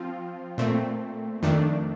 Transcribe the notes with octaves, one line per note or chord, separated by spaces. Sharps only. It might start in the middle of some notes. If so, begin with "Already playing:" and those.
Already playing: F3 C4 F4
A#2 A3 C4
F2 D#3 A3 D4